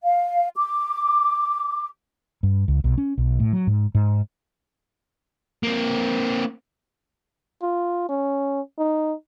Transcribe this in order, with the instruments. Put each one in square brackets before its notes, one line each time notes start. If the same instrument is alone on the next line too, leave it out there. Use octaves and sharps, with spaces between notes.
[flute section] F5
D6
[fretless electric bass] G2
C#2
B1
C#4
B1
A2
F#3
G#2
G#2
[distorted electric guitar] A#3 C4
[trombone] F4
C#4
D#4